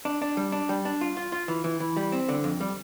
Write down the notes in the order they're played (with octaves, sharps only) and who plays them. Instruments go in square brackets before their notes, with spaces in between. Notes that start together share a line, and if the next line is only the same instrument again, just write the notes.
[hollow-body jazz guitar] D4
D4
G3
D4
G3
D4
F4
F4
F4
E3
E3
E3
G3
C4
D3
F2
G3